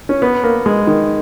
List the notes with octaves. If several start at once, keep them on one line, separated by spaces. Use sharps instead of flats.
C#4
B3
A#3
G#3
D#3